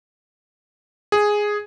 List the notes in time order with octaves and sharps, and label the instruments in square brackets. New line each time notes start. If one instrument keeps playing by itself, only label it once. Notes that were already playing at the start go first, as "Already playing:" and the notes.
[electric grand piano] G#4